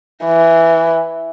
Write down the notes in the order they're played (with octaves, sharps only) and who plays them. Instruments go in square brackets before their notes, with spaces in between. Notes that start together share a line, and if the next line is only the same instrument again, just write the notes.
[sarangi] E3